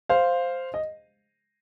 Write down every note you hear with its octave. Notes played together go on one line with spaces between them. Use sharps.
C5 F5
D#5